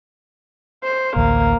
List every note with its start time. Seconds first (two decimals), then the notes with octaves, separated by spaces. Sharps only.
0.84 C5
1.16 A1 D2 A#3